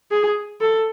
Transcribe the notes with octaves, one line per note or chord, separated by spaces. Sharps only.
G#4
A4